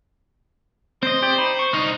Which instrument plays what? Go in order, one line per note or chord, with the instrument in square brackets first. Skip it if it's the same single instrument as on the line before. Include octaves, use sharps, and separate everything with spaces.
[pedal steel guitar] C4 D#5 [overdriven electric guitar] C5
[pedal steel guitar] G4 D5 G5
D#4 B5
C#6
[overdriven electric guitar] C2 D#4